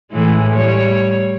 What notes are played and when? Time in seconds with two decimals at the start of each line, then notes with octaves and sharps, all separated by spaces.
0.11 A2 E3 G#3
0.54 G3 C#5